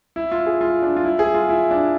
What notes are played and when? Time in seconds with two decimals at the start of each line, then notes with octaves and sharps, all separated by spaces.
0.16 E4
0.32 F4
0.46 G#4
0.61 F4
0.82 D4
0.96 F4
1.05 E4
1.19 G#4
1.34 F4
1.49 E4
1.71 D4